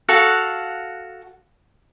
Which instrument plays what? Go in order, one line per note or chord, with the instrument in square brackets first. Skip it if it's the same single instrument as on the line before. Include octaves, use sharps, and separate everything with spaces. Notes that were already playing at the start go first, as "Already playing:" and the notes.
[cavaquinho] F#4 A4 F5 F#5